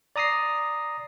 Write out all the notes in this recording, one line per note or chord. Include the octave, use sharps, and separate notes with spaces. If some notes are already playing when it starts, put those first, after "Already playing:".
D5 A#5 D#6 A#6 C7